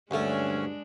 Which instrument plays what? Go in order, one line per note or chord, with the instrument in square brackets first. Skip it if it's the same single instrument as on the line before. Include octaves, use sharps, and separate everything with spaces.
[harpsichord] D2 A3 [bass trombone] G2 [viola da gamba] G#3 D4 [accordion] C#4